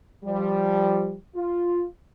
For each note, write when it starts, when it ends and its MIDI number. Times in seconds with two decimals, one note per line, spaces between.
0.25 1.15 53
0.25 1.15 55
1.35 1.84 65